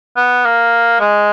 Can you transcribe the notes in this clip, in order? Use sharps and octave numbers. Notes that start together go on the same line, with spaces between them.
B3
A#3
G#3